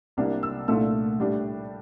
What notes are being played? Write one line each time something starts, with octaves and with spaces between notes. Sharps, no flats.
C2 C3 G3 A#3 D4
E6
C2 A#2 A3 D4 F4 E6
A2 G3 D4